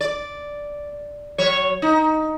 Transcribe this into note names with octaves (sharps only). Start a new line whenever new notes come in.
D5
F#3 C#5
D#4